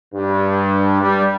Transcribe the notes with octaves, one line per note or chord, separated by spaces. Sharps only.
G2
G3